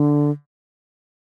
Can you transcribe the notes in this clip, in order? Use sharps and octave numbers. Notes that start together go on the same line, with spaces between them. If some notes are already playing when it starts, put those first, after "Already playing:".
Already playing: D3